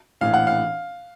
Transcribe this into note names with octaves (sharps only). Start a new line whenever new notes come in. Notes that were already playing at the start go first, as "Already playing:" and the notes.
A#1 A2 E3 F5
F#5
F5